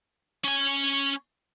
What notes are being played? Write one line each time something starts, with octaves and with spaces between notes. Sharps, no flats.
C#4 G#5